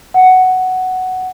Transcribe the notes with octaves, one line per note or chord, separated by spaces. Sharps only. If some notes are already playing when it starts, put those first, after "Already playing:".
F#5